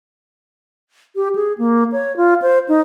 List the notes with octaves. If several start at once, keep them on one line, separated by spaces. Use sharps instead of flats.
G4
G#4
A#3
C#5
F4
C5
D#4